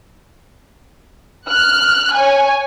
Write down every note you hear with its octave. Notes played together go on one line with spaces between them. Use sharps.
F6 F#6
C#5 G#5